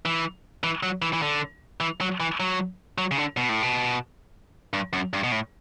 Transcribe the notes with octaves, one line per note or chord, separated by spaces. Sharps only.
E3
E3
F#3
E3
E3
D3
E3
F#3
E3
F#3
F#3
C#3
D3
B2
A2
B2
G2
F#2
G2
B2
A2